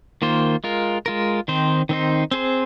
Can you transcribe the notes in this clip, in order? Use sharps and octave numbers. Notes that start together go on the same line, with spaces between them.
D#3 A#3 F4 C5
G#3 F4 A#4
G#3 F4 A#4
D#3 C4 D#4 C5
D#3 C4 D#4 C5
C4 G#4 C5